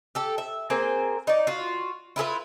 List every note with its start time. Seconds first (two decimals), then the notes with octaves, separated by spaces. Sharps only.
0.15 G4 A4
0.38 E5
0.70 A#3 C4 G#4 C5
1.27 D#4 D5
1.47 F4 F#4
2.16 E4 F4 G#4 B4